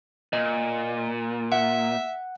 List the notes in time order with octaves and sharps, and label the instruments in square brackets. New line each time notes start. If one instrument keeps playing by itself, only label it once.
[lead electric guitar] A#2 [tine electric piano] D#5
[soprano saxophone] E5 [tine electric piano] F#5